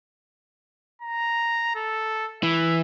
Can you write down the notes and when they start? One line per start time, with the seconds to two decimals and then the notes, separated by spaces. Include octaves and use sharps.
1.02 A#5
1.75 A4
2.43 E3 E5